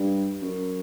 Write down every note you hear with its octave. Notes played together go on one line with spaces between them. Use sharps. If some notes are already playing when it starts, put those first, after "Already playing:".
Already playing: G2
F#2